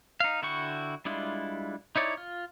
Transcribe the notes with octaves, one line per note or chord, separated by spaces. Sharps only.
D#4 F5
D3 E4 F#4 G5 C#6
G3 G#3 D4 E4 F4
D#4 E4 C#5 D5
F4